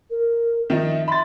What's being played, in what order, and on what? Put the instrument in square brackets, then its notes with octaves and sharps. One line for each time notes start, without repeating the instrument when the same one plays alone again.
[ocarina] A#4
[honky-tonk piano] D#3 F3 D#4 [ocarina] E5
[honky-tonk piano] B5 A6 [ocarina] C6